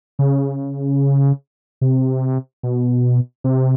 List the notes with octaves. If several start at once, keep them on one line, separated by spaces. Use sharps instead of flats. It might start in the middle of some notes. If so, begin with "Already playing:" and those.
C#3
C3
B2
C3